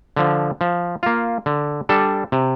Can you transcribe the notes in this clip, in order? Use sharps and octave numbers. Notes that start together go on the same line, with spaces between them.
D3 F3
F3
A#3 F4
D3
G3 D4 A4
C3